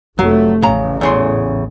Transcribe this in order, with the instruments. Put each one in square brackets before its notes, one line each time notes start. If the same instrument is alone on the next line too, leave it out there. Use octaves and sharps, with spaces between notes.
[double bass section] F1 A3 [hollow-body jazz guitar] F#3
[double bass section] A1 [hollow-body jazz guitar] C#3 A#5
[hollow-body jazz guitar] E2 C#3 C6